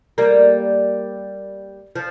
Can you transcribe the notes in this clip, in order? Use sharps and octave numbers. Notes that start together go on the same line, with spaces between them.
G3 A#3
F3